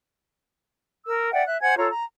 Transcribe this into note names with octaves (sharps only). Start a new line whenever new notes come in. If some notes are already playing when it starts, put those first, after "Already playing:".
A#4 E6
D5 E5 F#5 G5
E5 F#6
C5 F#5 G#5 G#6
F4 A4 C#5 A#5
A#5